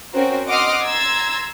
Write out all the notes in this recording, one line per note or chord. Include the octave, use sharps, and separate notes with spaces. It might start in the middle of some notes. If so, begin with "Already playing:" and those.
C4 C#4 F#4 A#4 C5
D#5 F#5 C6 D6 D#6 F6
A#5 C6 E6 G#6 A6